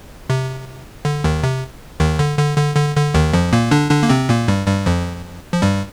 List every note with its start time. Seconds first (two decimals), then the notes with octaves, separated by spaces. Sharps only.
0.30 C3
1.05 D3
1.24 D#2 D#3
1.43 C3
2.00 D#2 D#3
2.19 D3
2.39 D3
2.58 D3
2.76 D3
2.96 D3
3.14 D#2 D#3
3.33 F2 F3
3.53 A#2 A#3
3.71 D3 D4
3.91 D3 D4
4.03 A#3
4.09 C3 C4
4.29 A#2 A#3
4.48 G2 G3
4.67 G2 G3
4.86 F2 F3
5.52 F3
5.62 G2 G3